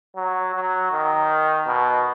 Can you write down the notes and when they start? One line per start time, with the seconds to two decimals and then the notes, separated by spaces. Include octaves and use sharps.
0.16 F#3
0.54 F#3
0.92 D#3
1.67 B2